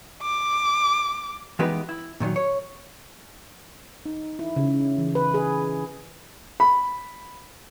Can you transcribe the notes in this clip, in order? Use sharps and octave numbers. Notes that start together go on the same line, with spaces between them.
D6
E3 G#3 B3 D#4 G4 B4
E4
A#2 D#3 F3 F#3
C#5
D#4
E4
C#3
E3
B4
G#4
B5